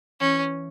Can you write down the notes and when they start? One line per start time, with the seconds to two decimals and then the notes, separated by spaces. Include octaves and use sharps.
0.20 E3 C#4